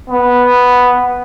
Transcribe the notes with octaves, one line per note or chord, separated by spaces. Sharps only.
B3